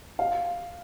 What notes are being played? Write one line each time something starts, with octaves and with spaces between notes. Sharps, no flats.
F5